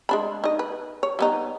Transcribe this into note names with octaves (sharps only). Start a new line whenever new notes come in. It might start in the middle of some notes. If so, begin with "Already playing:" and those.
G#3 D4 B5
D#4 D#5
B4
C#5
G3 B3 D#4